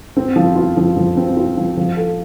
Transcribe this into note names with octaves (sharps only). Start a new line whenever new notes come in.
C4
F3
F4
F3
F3
C4
F4
F3
F3
A4